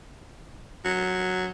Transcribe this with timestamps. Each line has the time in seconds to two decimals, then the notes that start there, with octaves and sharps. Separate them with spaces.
0.85 F#3